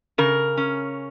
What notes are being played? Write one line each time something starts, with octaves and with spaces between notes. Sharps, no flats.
C#3 A#4
C#4